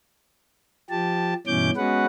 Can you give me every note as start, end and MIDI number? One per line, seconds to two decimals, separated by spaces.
0.90 1.34 53
0.90 1.34 67
0.90 1.34 81
1.47 1.71 43
1.47 1.71 47
1.47 1.71 52
1.47 1.71 61
1.47 1.71 86
1.47 1.71 91
1.77 2.06 56
1.77 2.06 59
1.77 2.06 61
1.77 2.06 66
1.77 2.06 71
1.77 2.06 78